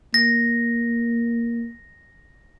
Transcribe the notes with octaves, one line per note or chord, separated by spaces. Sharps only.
A#3 A#6